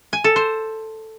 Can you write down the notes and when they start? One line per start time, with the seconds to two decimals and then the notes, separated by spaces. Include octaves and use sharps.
0.13 G#5
0.24 A4
0.36 C5